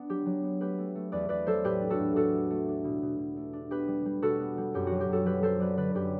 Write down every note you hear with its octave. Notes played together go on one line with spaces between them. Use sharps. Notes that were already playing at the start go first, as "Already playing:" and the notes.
Already playing: B3 D4
F#3 G4
F#3
B3
A3 G4 B4
A3
A3
E2 B4 D5
E2 B4 D5
F#3 A4 C5
A2 G4 B4
D4
F#4 A4
A2
A2 F#4 A4
A3
A3
D4
B2
B2
B2
A3
D4
B3 G4 B4
G3
G3
B2 F#4 A4
B3
G3
F#2 G4
F#3 F#4
G4
F#2 F#4 A4
F#3 G4 B4
F#3 A4 C5
F#3 B4 D5
D3 B4 D5
F#2 G4 B4